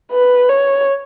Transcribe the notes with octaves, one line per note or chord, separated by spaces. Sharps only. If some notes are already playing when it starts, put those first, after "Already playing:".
B4
C#5